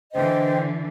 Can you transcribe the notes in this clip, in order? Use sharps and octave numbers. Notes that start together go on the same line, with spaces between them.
D3 E3 C5 D#5 G5